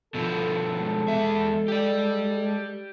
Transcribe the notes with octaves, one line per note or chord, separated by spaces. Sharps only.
B2 F3 A4
G#3
E2 E5
G4 D5